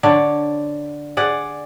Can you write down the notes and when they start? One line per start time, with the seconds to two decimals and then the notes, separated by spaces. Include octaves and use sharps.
0.03 D3 C#5 D5
1.17 G#4 D5 F#5